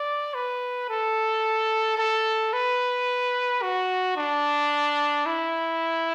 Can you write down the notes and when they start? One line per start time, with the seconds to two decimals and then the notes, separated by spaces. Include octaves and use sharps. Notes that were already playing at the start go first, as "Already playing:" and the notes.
Already playing: D5
0.34 B4
0.89 A4
1.98 A4
2.53 B4
3.62 F#4
4.16 D4
5.26 E4